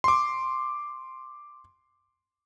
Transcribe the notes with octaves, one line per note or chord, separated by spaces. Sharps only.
C6 D6